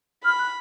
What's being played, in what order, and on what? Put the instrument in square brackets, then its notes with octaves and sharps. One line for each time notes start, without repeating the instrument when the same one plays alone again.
[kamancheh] B5 [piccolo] F6
[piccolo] F#6